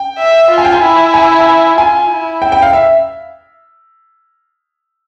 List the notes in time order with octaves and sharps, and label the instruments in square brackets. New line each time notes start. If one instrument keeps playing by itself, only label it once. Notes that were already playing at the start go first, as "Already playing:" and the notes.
Already playing: [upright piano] G5
[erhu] E5
F4
[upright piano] G#5
G5
G#5
[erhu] E4
[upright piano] G#5
G#5
[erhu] F4 [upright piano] G#5
[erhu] E4
[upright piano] G5
G5
F5
E5